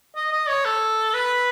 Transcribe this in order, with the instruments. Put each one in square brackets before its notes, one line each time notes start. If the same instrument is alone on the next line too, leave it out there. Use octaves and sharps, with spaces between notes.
[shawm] D#5
D#5
C#5
A4
B4